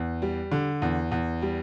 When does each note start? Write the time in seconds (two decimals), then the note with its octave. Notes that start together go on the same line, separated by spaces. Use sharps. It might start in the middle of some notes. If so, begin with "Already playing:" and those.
Already playing: E2
0.22 G3
0.52 D3
0.82 E2
1.11 E2
1.42 G3